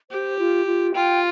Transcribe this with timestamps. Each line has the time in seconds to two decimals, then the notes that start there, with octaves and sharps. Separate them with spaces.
0.11 G4 C5
0.39 F4
0.66 F4
0.94 F4 G5